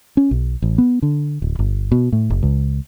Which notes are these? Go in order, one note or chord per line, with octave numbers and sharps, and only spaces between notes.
C#4
B1
A1
B3
D3
D1
G1
B2
A2
F#1
C#2